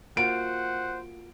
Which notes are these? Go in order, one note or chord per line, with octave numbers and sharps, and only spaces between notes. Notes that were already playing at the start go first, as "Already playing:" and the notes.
A#3 F4 F#4 C5 F#5 D7